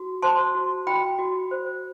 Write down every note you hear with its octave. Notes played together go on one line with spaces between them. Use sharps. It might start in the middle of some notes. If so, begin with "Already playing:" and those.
Already playing: F#4
C5 A5 C6
F#4
F#4 G5 B5
F#4
C5